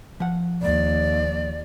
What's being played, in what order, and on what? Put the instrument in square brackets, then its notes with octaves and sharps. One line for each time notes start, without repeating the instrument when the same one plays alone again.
[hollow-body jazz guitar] F3 F#5
[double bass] D#2 [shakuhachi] D5